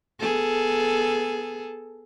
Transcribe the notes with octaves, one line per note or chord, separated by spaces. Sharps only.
B3 G#4 A4